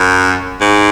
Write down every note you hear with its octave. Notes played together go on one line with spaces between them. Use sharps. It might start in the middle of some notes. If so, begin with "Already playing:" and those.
Already playing: F#2
G#2